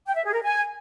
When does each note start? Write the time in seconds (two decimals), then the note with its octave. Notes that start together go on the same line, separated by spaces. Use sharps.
0.07 G5
0.16 E5
0.25 G#4
0.34 A#4
0.43 G#5